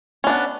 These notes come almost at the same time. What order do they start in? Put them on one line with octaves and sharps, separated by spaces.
C#4 D4 B3